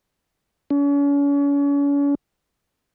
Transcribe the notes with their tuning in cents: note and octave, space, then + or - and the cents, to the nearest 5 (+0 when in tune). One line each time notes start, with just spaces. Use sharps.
C#4 +40